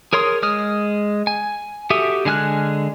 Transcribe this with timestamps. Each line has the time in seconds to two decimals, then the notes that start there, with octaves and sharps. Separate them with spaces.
0.13 G#4 A#4 C#5 C6 D#6
0.43 G#3 D#6 F6
1.27 G#5
1.90 F#4 G4 A4 E5 D#6
2.25 D3 G#3 G#5 F6 F#6